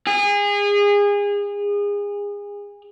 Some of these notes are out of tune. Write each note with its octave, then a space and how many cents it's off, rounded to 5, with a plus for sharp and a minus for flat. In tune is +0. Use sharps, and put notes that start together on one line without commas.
G#4 -30